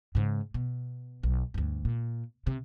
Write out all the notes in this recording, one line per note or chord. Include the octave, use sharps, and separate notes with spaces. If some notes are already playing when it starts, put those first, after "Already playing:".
G#2 C#3
B2
B1
D2 G2
A#2
C3